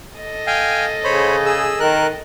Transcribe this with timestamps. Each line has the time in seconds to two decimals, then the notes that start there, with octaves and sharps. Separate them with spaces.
0.18 A4 D#5
0.47 F5 G5 G#5
1.04 C#3 C5 C#5 B5
1.46 G#4 E6
1.80 D#3 A#4 F#6